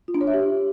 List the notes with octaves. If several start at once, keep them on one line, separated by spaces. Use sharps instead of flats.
F4
D4
C#5
E5
G4